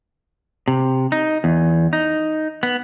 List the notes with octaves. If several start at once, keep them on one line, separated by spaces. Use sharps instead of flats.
C3
D#4
E2
D#4
B3